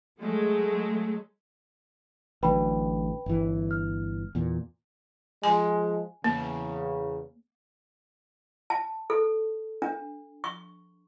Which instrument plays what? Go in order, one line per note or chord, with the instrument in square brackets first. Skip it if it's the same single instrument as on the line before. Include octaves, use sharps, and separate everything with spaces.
[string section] F#3 G#3 A3
[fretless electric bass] A1 D3 F#3 [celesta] B4 G5 B5
[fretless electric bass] G1 E3
[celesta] F6
[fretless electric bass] E2 A#2
[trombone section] F3 G#3 [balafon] G#5
[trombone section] E2 C#3 [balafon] A#3
[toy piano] A5
A4
D4
C#6